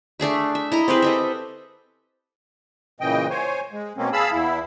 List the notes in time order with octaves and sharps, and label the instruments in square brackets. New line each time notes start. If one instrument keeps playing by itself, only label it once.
[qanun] A3 D4 G#4 E5
E5
E4 D#5 A#5
C4 G4 G#4 B4
A4 D#5 E5
[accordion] A#2 C#3 E3 D#5 G5
C5 C#5 G#5
G#3
B2 A#3 C4 C#4
G#4 F5 A5 B5 E6
E2 E4